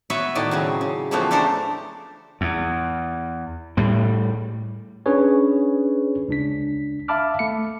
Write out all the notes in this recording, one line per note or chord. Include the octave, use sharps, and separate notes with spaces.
B3 F#4 B4 C#5 E5
A2 D#3 D5 D#5
C#3 F#3 C4
C#3
C#3 E3 F3 A3 B3 C4
A3 D4 G4 A4 A#4 C5
E2
A2 G3
C#4 D4 G#4 B4 C#5
C#2 D4 B6
E5 F5 A5 B5 D6 F6
A3 C#7